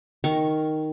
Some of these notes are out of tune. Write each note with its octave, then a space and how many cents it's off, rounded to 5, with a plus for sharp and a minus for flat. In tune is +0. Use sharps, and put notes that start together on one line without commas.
D#3 +0 A#4 +0 C#6 -5